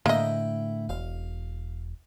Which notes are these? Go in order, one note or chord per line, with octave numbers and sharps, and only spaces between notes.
A2 D3 A#3 E4 D#5 E5 G5
E1 F5